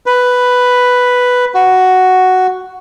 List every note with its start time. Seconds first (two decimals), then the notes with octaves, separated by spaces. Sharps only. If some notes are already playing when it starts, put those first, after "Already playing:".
0.06 B4
1.54 F#4